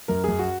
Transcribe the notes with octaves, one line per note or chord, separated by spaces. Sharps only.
F#2 A#4
F#2 G#4
F#4